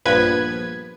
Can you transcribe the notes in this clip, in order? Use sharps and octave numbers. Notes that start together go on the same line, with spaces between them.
A#1 G2 F3 B3 B4 G#6